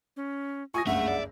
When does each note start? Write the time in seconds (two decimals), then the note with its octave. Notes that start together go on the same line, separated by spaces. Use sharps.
0.16 C#4
0.74 F4 G#5 C#6 D#6 A#6
0.87 F#1 C#2 G2 A3 E5 F#5
1.08 D5